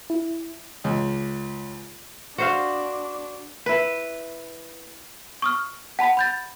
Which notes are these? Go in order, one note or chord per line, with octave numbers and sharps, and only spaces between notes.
E4
C#2
D4 F#4 C5 F5
E4 B4
C#6 D#6 F6
F#5 A5 B5
B5 G6 A6